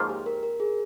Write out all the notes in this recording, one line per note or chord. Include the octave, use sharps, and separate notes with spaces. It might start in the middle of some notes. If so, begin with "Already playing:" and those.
Already playing: G#2 F3 A#3 C#4 F4
G4
A#4
A#4
G#4